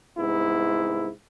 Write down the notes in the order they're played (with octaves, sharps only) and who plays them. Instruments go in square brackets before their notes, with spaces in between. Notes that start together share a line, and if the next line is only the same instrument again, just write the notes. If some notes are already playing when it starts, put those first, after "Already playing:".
[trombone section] C2 G#2 B3 E4